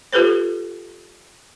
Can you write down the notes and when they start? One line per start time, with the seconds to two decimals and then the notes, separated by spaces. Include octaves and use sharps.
0.13 F4 G4 A4 B4 C5